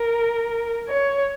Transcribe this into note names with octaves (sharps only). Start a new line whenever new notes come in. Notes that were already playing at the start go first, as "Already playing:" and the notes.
Already playing: A#4
C#5